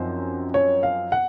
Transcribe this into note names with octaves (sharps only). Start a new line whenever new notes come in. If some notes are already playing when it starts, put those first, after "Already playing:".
Already playing: F#2 F3 C4 D#4 C5
C#5
F5
F#5